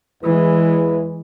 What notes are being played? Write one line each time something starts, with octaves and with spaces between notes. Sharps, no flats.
E2 E3 G#3 E4 B4